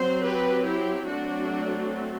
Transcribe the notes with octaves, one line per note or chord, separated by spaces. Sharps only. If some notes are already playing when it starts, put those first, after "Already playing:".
Already playing: F#3 C4 C5
G4 B4
E4 G4
F#3 A3 C4 D4 F#4